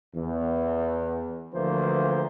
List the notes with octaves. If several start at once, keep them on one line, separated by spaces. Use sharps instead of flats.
E2
D2 E3 F3 A#3 C5